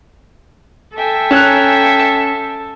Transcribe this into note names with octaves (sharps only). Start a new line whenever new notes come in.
A4 E5 G5 G#5
C#4 A5 A#5 F#6
A5